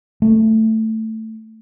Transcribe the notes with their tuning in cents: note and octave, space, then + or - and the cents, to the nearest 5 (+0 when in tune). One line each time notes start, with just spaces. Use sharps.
A3 +10